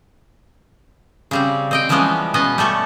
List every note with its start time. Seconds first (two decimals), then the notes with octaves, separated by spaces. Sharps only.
1.31 C#3 G3 C4
1.71 C4 D#5 G5
1.89 E3 F3 G3 G#3 B3 C#4
2.34 B2 B3 C#4 D#5
2.58 G3 A3 A4 C#5